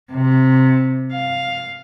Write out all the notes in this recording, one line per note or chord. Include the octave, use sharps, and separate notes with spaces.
C3
F5